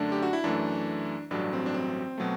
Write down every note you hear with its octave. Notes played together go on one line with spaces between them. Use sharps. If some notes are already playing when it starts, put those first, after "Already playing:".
Already playing: F#2 D3 A3 D4
G4
F#4
E4
F#2 E3 A3 D4
A1 G2 F#3 A3 D4
C4
D4
C4
B2 F#3 A3